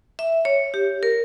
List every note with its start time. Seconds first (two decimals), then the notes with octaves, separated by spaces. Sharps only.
0.19 E5
0.45 C#5
0.74 G4
1.03 A#4